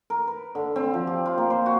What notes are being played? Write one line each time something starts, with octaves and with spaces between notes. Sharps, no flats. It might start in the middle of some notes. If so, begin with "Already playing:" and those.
A#4
B4
D3
C4
F3
G4
F4
A#3
C5
F#4